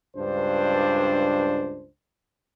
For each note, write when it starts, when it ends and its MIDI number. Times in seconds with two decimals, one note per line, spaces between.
0.16 1.88 37
0.16 1.88 43
0.16 1.88 62
0.16 1.88 72